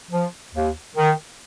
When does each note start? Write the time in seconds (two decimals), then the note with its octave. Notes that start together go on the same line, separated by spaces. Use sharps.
0.11 F3
0.54 D#2
0.96 D#3